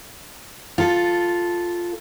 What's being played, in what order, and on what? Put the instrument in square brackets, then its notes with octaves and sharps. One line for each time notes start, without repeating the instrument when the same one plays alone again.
[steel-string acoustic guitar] F4 A4